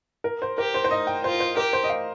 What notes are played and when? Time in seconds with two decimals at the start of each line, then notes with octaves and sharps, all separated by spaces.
0.24 A#4
0.42 C5
0.58 G4 A#4
0.74 C5
0.84 C5
0.91 D#4 D#5
1.07 G5
1.24 F4 C5
1.40 C5
1.57 G4 A#4
1.73 C5
1.84 D#5
1.89 F5